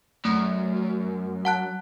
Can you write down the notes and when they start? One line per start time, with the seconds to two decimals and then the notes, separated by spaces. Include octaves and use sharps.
0.25 F#2 A3
1.45 F#5 A5 F#6